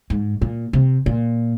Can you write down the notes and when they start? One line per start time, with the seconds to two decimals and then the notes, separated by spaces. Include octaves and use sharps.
0.10 G#2
0.42 A#2
0.73 C3
1.06 A#2